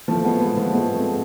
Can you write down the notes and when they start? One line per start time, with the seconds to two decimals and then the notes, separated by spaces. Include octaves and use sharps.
0.08 F3 A3
0.24 G#3 B3
0.40 G#3 B3
0.56 F3 A3
0.73 G#3 B3
0.94 A3 C4